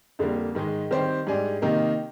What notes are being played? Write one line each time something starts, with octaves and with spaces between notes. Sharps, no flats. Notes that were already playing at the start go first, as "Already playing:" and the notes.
F2 D3 G3 A#3
G#2 D#3 G#3
D#3 G3 C4 G4 C5
G#2 G3 D4 G#4
C3 D#3 A#3 D#4